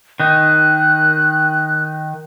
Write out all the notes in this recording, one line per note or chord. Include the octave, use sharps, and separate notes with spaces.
D#3 D#4 F#6